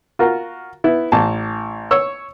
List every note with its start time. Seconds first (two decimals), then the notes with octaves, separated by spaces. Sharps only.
0.19 F4 F#4 A#4
0.84 B3 E4
1.12 A1 A5
1.91 C#5 C#6 E6